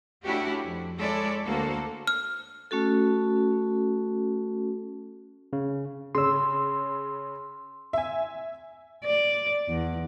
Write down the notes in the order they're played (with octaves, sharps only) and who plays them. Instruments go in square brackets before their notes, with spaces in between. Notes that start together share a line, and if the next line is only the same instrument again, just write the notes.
[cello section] A3 C#4 D4 E4 F#4 G4
F2
G#3 E4 A4 C#5 D5
D2 A#3 F#4 A4 C5
[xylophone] F6
[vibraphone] A3 C#4 F#4 A4
[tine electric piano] C#3
[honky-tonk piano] C#3 C#4 [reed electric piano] C6 E6
[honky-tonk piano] E5 G#5
[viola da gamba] D5
E2